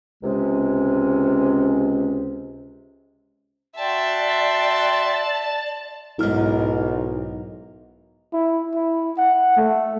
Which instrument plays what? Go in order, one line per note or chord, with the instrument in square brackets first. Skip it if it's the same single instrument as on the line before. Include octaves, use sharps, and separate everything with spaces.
[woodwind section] C#2 C3 G#3 C#4
[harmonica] F#4 G5 C6 [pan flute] D5 [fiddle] E5 [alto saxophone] A5
[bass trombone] B1 [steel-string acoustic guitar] G#2 A#4 [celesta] E4 F6
[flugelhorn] E4
E4
F#5
A3